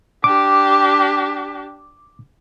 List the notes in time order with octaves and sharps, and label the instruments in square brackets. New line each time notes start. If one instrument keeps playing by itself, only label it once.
[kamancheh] D4 G4 [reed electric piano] D6